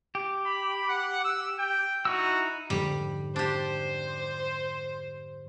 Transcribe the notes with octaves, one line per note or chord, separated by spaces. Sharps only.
G4
B5
F#5
E6
G5
D#4 E4 F#4 E6
F2 G#2 D3 G3
D4 G4 C5